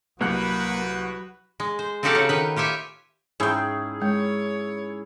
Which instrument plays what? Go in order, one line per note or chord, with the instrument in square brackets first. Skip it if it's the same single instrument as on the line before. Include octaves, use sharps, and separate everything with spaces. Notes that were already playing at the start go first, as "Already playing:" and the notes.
[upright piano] C2 F#6 C#7 [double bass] F#3 [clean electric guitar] A#3 [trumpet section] F#4 B4
[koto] G#3
C5
C4 D#4 F#4 G4 A4 F5
C#3 C#5
D#3 B4
F4 G4 C#5 E5 G#5
[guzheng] G#2 G5 [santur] C#4 E4 G#4
[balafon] G#3 [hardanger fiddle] C#5